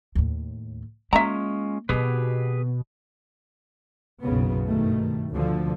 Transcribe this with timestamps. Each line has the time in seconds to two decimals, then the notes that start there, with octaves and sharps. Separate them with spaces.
0.15 D#2 A2
1.13 G#3 A#3 C#4 F4 E5 A#5
1.89 B2 D#3 C4 G4 G#4 B4
4.22 F#1 B1 C#3 B3
4.67 G2 B2 D#3 A3
5.33 D2 B2 D3 F3